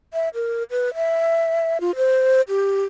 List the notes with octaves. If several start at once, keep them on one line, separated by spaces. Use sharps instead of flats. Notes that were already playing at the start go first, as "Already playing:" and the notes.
E5
A#4
B4
E5
F4
C5
G4